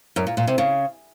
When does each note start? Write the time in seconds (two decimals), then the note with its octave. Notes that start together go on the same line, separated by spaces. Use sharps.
0.16 F#2
0.27 A#2
0.37 A#2
0.47 C3
0.58 C#3